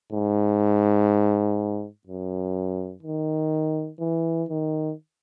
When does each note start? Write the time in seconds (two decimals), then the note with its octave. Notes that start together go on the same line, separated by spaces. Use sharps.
0.12 G#2
2.07 F#2
3.03 D#3
4.00 E3
4.49 D#3